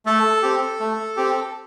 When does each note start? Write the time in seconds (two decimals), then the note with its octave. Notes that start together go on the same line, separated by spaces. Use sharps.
0.06 A3 A4
0.42 C4 G4
0.80 A3
1.17 C4 G4